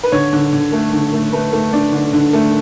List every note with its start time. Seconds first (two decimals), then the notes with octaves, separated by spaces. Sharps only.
0.04 B4
0.12 D3 C#5
0.33 D3
0.53 D3
0.72 A3
0.93 D3
1.13 A3
1.33 A3 B4
1.53 A3
1.73 D4
1.93 D3
2.13 D3
2.33 A3